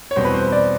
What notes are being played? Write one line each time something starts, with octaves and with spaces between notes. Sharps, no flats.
C#5
E2 B2 G3 C4 C5
B4
C5
D5